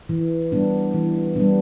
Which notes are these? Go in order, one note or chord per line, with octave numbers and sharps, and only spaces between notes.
E3
G3 B3 D4
E3
G3 B3 D4